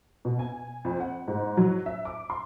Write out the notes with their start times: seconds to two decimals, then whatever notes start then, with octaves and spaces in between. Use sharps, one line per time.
0.25 B2
0.39 G#5
0.85 F2
1.00 F#5
1.28 G#2
1.57 F#3
1.86 E5
2.05 D6
2.30 C6